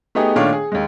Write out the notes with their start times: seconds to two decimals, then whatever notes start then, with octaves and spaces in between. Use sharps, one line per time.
0.15 A3 B3 D#4 G4 G#4
0.36 A#2 D#3 A3 D4 C#5 F5
0.53 G#4
0.72 D#2 G#3